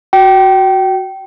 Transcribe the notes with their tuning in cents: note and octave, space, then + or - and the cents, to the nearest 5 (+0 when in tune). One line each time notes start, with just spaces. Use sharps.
F#4 +0 G5 -25